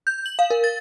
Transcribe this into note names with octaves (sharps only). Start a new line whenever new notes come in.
G6
F#7
F5
A#4
A6